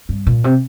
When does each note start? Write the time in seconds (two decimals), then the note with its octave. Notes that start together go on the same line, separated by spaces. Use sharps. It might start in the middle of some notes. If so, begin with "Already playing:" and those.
0.09 G2
0.27 A#2
0.44 C3